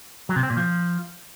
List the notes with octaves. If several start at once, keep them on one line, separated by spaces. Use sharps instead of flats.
F#3
C3
C4
A#2
F3